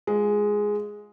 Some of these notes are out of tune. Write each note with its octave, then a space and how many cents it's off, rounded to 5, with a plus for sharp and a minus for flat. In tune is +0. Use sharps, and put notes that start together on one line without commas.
G#3 +0 F4 +15